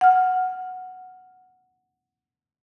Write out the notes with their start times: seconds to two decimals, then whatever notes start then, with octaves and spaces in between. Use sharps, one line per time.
0.01 F#5 F6